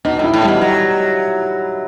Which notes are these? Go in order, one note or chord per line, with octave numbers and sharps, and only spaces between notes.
B2 D#4
A2 E4
A2
B2 G3
F#3